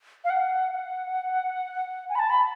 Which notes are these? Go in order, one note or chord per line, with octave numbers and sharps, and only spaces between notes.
F5
F#5
F#5
G#5
B5
A5
B5